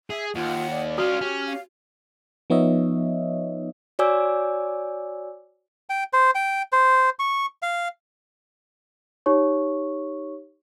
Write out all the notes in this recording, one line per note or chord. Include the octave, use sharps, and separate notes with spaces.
G#4 E5
D#2 F4 F#5
D5
C#4 F4 F#4 F6
C#4 G4
F5
F3 B3 D#4 C#5 D#5 E5
F#4 C#5 D5 G#5 D6 E6
G5
C5
G5
C5
C#6
F5
D#4 G4 C#5 C#6